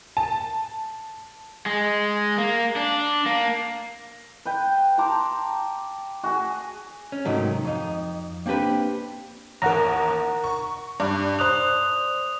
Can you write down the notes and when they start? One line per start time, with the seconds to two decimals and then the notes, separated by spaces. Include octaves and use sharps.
0.17 A5
1.66 G#3
2.38 A#3
2.76 D4
3.26 A#3
4.45 B4 G5
4.98 A5 A#5 C6 D6
6.24 F#4 G#4 G#5
7.12 C#4
7.25 G#2 C3 D#3 F#3 A3
7.64 F2 D#4
8.46 A#3 C4 D4 G4 B4
9.62 A1 D#2 A#4 F#5 A#5
10.44 C#6
11.00 G2 D5
11.39 C5 D#6 F#6 F7